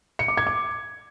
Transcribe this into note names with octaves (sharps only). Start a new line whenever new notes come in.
C#7
D6
G#6
D6